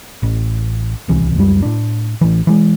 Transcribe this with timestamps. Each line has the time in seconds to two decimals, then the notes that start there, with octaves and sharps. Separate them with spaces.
0.23 A1
1.08 D1 C2 E3
1.36 C#2 F#2 G3
1.62 A2 D4
2.21 A1 E3
2.47 E3 G#3